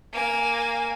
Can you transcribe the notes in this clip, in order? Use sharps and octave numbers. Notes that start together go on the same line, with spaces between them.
A#3 G#5